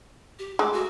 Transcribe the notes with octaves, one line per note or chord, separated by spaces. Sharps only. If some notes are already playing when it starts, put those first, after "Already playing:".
G4
G#3 A3 D6
F#4